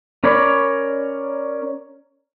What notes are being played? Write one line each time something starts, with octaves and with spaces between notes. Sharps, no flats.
C#4 A#4 C#5 D5 B5